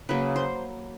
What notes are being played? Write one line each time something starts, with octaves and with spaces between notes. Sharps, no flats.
C#3 F#3 A#3 B4
C5